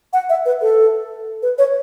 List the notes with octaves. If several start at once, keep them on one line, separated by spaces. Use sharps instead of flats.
F#5
E5
B4
A4
B4
C#5